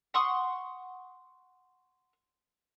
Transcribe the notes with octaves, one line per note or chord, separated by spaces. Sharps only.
F#5 C6 C#6 D#6